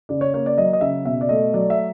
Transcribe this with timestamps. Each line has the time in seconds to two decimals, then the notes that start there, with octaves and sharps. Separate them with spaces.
0.09 C#3 D5
0.21 C#5
0.34 A#3 C#5
0.46 D5
0.58 F#3 D#5
0.73 D#5
0.81 C#3 E5
1.05 B2 E5
1.21 D5
1.29 A3 D#5
1.53 F#3 D5
1.70 E5